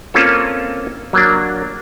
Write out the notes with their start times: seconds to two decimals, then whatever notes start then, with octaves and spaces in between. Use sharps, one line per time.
0.14 A#3 C4 C#4 F4 A4
1.13 F#3 A#3 D4